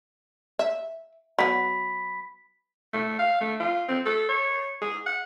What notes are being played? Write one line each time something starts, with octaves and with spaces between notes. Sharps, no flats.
E5
F#3 B3 B5 B6
A3
F5
A3
F4
C4
A4
C#5
G#4
F#5